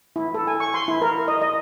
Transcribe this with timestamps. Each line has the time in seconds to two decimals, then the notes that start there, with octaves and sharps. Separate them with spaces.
0.16 E4
0.34 A4
0.47 G#5
0.60 C#6
0.74 C6
0.88 E4
1.02 A#4
1.28 D#5
1.42 D#5